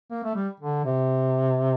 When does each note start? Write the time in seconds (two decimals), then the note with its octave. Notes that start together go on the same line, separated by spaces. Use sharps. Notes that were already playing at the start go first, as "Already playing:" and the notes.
0.11 A#3
0.24 A3
0.35 G3
0.60 D3
0.85 C3